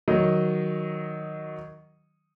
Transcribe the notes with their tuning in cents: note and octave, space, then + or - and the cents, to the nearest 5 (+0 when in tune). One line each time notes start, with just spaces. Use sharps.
D#3 +0 F#3 +0 D#5 +0